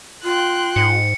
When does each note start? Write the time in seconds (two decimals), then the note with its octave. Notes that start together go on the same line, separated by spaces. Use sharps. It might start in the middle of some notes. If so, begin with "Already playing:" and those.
0.24 F4 G5 C6 F#6
0.76 G#2 C#7